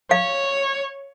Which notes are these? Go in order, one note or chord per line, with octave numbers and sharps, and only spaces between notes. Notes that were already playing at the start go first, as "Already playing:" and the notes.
C#5 F5